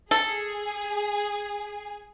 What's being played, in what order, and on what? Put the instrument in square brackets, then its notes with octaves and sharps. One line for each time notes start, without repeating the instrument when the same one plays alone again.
[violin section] G#4 [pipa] A4